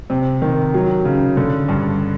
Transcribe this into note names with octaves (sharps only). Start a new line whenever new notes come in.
C3
D#3
F#3
C#3
D3
G2